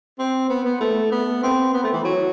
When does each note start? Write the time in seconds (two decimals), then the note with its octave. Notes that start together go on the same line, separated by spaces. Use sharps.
0.19 C4
0.49 B3
0.64 B3
0.80 A3
1.11 B3
1.43 C4
1.74 B3
1.83 A3
1.93 E3
2.04 F#3